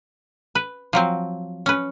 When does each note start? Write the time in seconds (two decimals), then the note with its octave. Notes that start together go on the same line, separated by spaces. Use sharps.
0.55 B4
0.93 F3 F#3 C4
1.66 C#4 B4